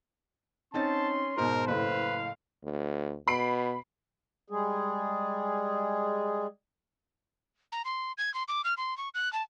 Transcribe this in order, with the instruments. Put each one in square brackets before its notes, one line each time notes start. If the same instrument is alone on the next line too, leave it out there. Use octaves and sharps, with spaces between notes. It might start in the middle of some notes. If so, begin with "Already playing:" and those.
[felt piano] C4 D#4 A6 [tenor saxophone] C#4 [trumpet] A5 [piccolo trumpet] C6
[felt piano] G#2 B2 [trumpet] A#4 [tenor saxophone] C5
[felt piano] F#1 A2 [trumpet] B4 [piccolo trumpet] F5
[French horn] D2
[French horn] B2 [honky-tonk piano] B5 C7 D7
[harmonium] G3 G#3 G#4
[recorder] A#5
C6
G#6
C6
D6
F6
C6
C#6
F#6
A5